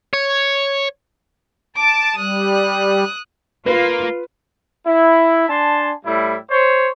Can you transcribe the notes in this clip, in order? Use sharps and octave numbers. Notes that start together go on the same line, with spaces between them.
C#5
A5 D6 D7
G3 D#6 F#6
A#3 F4 B4
E4
D4 G#5 A5 C6
A2 G3 E4
C5 C#5